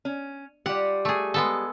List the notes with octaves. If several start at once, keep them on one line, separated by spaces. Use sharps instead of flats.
C#4
G3 F4 G4 F#5
A3 G#4
G#3 B3 A4